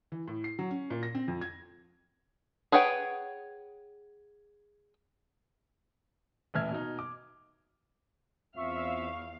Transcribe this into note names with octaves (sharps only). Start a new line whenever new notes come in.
E3
A2
C7
F#3
C#4
A#2
A#6
C4
F2
G#6
G#4 B4 C#5 F#5 G5
D#1 A2 E3 E5 F6 G#6
B2 D#4
D6
E2 C4 F4 E5 F5 C#6